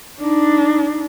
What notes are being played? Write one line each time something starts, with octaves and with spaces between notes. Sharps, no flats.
D4 D#4